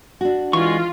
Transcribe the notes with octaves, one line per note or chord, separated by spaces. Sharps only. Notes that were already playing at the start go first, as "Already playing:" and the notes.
D4 F#4
E3 G#3 F4 C#6